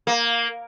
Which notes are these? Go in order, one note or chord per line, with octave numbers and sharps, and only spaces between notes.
A#3